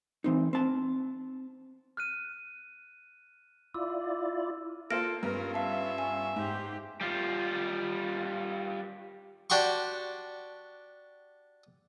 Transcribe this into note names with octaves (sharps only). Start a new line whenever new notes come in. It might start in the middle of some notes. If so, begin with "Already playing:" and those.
E3 C4 D#4
C4 A5
F6 F#6 D#7
E4 F4 D5 E6
A#3 F4 A4 C5 F6 A#6 D7
G2 B3 C#4 F4 A#4
E5 F5 A5
G#5
G#2 G4 C5
G3 F4
D4 F#4 G4 C6 C#6